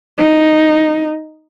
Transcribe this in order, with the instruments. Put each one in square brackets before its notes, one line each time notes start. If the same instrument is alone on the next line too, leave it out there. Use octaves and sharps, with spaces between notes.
[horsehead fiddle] D#4